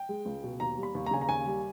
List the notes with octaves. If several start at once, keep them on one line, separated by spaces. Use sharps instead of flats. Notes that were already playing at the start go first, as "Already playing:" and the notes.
Already playing: G5
G#3
C#2
B2
D#2 A#5
G3
B5
D#2
A#5
C#3 G#5
A#5
D#2 G#5
G3